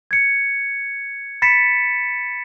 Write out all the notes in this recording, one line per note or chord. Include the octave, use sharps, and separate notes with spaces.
G#6 C#7
B5 A6 B6 C#7 E7